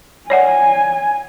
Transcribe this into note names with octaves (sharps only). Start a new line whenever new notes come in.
C#5 D5 F#5 G#5